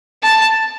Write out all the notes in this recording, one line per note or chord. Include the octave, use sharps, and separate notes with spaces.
A5